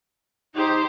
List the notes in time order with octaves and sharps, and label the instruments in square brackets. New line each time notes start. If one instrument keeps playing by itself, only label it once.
[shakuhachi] D#4 [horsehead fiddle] G4 C5